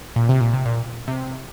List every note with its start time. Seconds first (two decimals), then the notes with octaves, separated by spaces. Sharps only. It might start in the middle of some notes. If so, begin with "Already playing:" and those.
0.16 A#2
0.29 C3
0.41 A#2
0.53 C3
0.66 A#2
1.08 C3